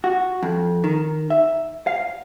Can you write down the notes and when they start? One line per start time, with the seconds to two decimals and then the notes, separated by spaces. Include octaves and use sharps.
0.04 F#4
0.43 F2
0.84 D#3
1.30 E5
1.87 F5